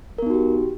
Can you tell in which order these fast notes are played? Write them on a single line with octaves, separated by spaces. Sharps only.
A#4 B3 D#4 F#4 G4